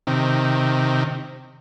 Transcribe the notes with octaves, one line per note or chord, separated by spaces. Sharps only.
C3 D#3